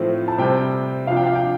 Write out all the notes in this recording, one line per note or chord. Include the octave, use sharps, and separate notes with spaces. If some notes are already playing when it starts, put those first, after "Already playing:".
Already playing: A2 F3 A3 C4
A5
C3 G3 C4 G5
C3 F3 D4 F5
G5
F5
G5